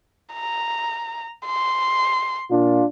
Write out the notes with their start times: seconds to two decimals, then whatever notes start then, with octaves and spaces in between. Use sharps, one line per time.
0.34 A#5
1.46 C6
2.49 A#2 D4 F4